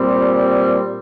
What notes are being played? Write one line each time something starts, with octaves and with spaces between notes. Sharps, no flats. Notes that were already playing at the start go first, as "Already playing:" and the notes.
Already playing: A#2 G3 C4